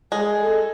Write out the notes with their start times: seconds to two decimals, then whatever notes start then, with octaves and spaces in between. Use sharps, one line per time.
0.11 G#3 G#4
0.40 A4